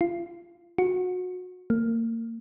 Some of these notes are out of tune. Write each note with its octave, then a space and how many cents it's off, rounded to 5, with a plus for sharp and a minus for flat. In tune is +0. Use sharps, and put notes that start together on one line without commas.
F4 -30
F#4 -25
A#3 -35